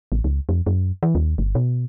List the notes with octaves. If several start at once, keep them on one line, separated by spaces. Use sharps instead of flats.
A1
C#2
F2
F#2
E3
D#2
G1
B2